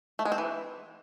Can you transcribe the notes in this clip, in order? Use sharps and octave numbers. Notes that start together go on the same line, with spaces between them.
A3
G#3
C4
E3